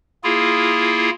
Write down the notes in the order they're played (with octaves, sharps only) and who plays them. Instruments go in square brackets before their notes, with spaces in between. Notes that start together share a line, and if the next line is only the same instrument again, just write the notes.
[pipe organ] A#3 E4 F4 G#4